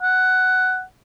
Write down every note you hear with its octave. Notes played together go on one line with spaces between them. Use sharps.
F#5